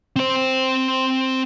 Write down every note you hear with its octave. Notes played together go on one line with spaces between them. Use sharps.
C4 C5